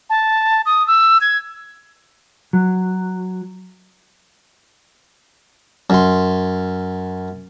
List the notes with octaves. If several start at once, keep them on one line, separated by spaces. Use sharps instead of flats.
A5
D#6
E6
G#6
F#3
F#2 C6